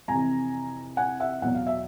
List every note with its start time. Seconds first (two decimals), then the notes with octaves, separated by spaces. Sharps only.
0.08 F2 C3 E3 G#5 A#5
0.97 F#5 G#5
1.20 E5 F#5
1.42 E2 B2 F#3 F#5
1.55 F5
1.67 E5